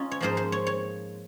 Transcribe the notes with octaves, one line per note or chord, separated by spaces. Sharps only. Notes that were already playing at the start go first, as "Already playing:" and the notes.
Already playing: C#4 D#4 F4
C#5
G#2 F3 A#3 C5
C5
C#5
C#5